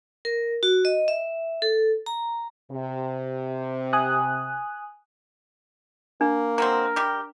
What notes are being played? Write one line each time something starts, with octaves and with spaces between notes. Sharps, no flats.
A#4
F#4
D#5
E5
A4
A#5
C3
G#5 D#6 F#6
A#3 D4
F#3 G#3 C4 A#4
G3 G4